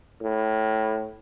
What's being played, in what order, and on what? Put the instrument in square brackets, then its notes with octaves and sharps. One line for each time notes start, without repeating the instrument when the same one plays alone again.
[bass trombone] A2